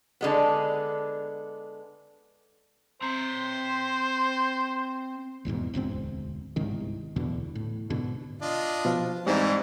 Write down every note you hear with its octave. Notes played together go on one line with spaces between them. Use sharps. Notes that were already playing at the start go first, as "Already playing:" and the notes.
D3 G#3 B3
C4 C5 A#5
F1 E2 G#2 B2
E1 D2 G#2 C4
G1 C2 G#2 D#3
D1 E2 B2 D3
A2
G#2 B2 D3
D4 F4 D#5
B2 F3 F5
G#2 E3 G3 C4 E4 D5 E5